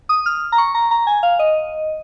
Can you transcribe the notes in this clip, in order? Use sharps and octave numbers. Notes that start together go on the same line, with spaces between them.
D#6
F6
A#5
C#6
A#5
A#5
G#5
F5
D#5